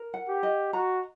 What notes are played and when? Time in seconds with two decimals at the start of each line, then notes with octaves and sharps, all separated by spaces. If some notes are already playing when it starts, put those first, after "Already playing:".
Already playing: A#4
0.14 F#5
0.28 G4
0.43 D#5
0.73 F#4 A#5